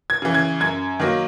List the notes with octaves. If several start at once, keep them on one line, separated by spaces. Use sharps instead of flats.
G#6
C#3 E3
G#6
F#2 G#6
D#3 F#3 A#3